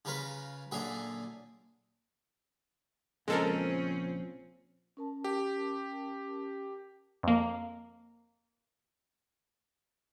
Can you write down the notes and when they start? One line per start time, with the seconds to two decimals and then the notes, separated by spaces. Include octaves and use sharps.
0.05 C#3 C#4 F4 A#4 B4
0.71 F#2 A#2 D3 G#4 E5 G#5
3.28 A#1 C#3 F3 G#3 C4 C#4 A4 A#4
4.97 C#4 A#4 A5
5.24 G4
7.23 F2 A#3